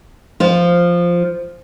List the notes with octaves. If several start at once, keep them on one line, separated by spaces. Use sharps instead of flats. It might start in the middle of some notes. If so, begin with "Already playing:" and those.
F3 F4